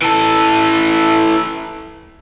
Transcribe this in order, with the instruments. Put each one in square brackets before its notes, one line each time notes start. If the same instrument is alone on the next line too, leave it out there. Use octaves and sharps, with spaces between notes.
[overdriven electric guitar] E3 A4